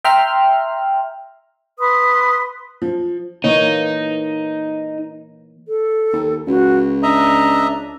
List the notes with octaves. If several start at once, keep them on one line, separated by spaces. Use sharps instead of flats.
E5 G5 A#5 C6 F6
B4 C6 D#6
F3
E3 A#3 D#4 C#5
A4
D#2
C#2 F#4
D4 D#5 E5 A#5